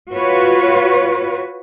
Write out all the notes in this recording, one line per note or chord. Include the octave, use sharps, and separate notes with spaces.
F4 F#4 B4 C#5